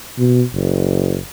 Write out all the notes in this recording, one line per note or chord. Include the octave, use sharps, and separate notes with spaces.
B2
F#1